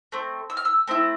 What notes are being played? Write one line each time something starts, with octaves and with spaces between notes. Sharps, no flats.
A3 C4
E6
F6
E6
A3 C4 E4